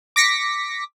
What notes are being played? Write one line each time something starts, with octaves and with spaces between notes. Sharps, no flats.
D6 A#6 B6 C#7